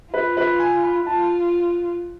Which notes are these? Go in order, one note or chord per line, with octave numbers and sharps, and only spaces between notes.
F4 B4
B4
G#5
B5
F4 A5